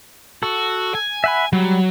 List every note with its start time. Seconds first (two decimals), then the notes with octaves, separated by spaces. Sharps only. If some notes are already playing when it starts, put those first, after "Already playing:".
0.43 F#4 A4
0.95 G#5
1.24 E5 F#5 B5
1.53 F#3 G3